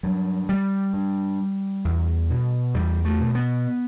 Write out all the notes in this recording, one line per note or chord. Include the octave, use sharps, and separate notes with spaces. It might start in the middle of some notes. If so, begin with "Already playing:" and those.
G2 F#3
G3
G2
E2
B2
E2 G3
A3
B2
B3